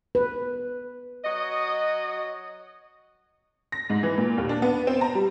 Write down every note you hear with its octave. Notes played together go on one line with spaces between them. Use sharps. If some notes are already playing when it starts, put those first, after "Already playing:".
B4
F#3 F#4 D#5
A#6
G#2
E3
A#2
D#2
D4
B3
C4
A#5
G3